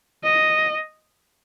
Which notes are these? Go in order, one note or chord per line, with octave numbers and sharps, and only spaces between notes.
D#5